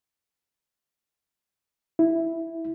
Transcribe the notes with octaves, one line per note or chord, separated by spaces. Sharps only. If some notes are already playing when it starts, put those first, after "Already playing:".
E4